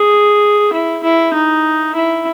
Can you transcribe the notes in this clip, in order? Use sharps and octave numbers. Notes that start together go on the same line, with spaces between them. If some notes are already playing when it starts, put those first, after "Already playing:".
Already playing: G#4
E4
E4
D#4
E4